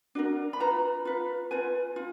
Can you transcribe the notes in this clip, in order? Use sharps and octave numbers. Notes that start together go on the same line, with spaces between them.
D4 F#4 A#4
B5
F4 B4 A#5
F4 B4
F4 B4 G#5
F4